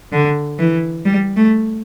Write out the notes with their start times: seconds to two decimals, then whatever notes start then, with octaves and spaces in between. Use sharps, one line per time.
0.12 D3
0.59 E3
1.06 G3
1.37 A3